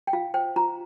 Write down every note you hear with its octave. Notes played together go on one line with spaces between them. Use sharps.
G5
F4 F5
C5 G5
F4 A#5